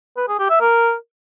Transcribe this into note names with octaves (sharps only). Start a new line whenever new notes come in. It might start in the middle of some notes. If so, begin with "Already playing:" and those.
B4
G#4
G4
E5
A#4